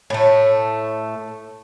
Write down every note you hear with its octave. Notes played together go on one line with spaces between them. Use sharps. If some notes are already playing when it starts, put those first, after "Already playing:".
A2 A3